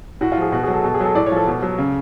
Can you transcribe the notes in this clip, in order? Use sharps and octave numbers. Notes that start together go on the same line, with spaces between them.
A2 F#4
F4
F3 G#4
B2 F#4
G#4
F#3
A4
B2 A4
G#4
F#3 A4
A2 D5
C#5
F3 A4
B2
F#3
C#3